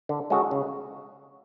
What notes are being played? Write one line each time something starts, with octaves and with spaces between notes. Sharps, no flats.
D3
G#3 C#4 F#4 A4
C#3